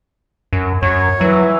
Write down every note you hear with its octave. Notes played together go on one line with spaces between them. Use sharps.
F#2
F#2 C#5
E3 F#3